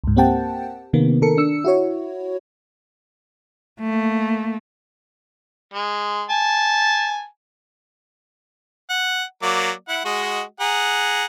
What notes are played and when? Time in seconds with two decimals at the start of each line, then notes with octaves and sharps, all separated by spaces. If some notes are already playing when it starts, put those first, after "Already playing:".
0.04 C#2 G#2
0.16 A#3 C4 G4 F#5 G5 A5
0.93 C3 D#3 A#3 B3
1.22 D#3 A4 A#4 C#7
1.37 D4 E6 C#7
1.64 E4 F#4 C#5
3.80 A3 A#3
5.74 G#3
6.30 G#5 A5
8.90 F#5
9.42 F#3 A#3 D5
9.88 E4 F#5
10.05 G#3 F#4 D#5
10.60 G#4 F#5 A#5